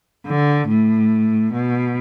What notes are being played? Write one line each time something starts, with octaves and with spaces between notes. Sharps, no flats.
D3
A2
B2